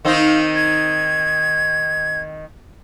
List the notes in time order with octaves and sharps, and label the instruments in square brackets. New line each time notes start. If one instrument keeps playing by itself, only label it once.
[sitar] D#3 C4 D#4 [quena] F5
[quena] G#6